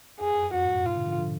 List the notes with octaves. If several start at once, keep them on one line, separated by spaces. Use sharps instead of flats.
F2 G#4
F#2
F#2
F2 F#4
F2 G#2
F#2 A#2
G#2 B2 F4
A#2 D3
D3 F3
D3 F3